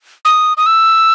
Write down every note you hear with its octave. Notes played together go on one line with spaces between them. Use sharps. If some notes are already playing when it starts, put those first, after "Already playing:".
D#6
D#6
E6